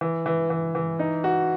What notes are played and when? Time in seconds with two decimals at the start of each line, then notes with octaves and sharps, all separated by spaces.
0.01 E3
0.26 E3
0.50 E3
0.75 E3
0.99 D#4
1.24 F#4